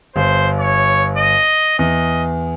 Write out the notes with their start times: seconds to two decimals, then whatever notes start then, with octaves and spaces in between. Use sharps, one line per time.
0.16 G1 C5
0.59 C#5
1.17 D#5
1.79 E2 D#5